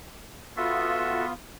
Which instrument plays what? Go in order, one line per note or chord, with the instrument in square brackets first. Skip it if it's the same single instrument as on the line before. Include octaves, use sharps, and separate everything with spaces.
[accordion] B3 F4 [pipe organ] F#4 A4 E5